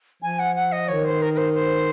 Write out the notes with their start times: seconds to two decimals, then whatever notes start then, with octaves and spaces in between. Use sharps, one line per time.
0.22 F3 G#5
0.39 F#5
0.55 F#5
0.72 D#5
0.88 D#3 C#5
1.05 C5
1.22 A#4
1.33 A#4
1.37 C5
1.54 C5